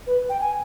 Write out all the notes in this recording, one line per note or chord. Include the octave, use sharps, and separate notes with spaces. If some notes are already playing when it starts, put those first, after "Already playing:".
B4
G5
G#5